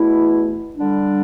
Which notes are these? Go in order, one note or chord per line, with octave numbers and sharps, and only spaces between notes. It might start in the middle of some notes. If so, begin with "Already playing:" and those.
Already playing: E2 B2 A3 E4
D3 G3 D4